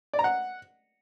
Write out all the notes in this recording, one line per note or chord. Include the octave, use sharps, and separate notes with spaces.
D5
A#5
F#5